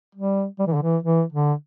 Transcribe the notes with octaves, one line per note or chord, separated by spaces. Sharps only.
G3
G3
E3
D3
E3
E3
D3